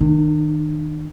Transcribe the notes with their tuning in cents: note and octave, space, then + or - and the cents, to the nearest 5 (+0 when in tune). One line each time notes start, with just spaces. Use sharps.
D#3 +0 D4 +45